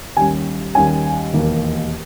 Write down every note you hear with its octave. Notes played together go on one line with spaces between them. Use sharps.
D#2 D#3 G3 C#4 G#5
D#2 D#3 G3 C#4 G#5
E1 D#2 D#3 A#3